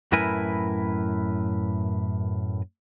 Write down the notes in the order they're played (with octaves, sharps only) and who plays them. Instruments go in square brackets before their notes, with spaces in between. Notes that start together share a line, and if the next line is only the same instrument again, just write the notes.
[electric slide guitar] F#2 A2 E4 A#4 B4 G#5